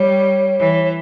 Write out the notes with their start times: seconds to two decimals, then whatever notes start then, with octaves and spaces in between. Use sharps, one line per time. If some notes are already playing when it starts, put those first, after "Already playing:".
Already playing: G3 C#5
0.59 E3